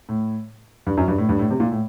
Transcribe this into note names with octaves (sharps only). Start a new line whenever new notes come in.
A2
G2
F#2
G2
A2
G2
A2
C3
A#2
A2